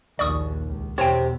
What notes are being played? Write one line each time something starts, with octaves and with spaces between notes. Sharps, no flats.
A#1 D#2 D5 C#6 D#6
C#2
E2 B2 D3 G4 C5 C#5 G5